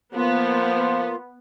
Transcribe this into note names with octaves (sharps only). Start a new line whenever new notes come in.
F3 A#3 B3 F4